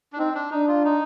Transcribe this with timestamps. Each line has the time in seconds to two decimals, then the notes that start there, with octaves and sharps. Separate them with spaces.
0.13 D4
0.18 C4 D#4
0.35 D4
0.51 D4 D#4
0.68 F4
0.85 D#4